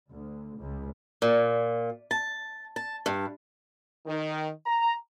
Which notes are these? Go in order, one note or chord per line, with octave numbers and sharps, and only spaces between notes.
D2
C#2
A#2
A5
A5
G2
D#3
A#5